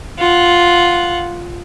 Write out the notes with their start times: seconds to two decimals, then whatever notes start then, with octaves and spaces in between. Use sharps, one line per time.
0.19 F4 F#5